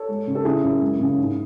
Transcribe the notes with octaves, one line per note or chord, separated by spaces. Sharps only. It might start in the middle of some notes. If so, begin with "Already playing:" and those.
Already playing: A4 C#5
G#3
C#3
A4
C#3 E4 G#4
F#2
G#3
C#3
G#2